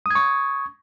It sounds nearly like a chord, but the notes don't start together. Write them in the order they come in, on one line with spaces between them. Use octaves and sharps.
D#6 G#6 C#6